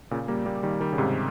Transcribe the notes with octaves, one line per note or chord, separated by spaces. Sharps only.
A#2 C#3
G3 A#3
G3 A#3
D#3 G3
D#3 G3
C#3
G#2 C3